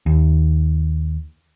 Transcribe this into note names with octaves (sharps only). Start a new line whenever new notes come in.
D#2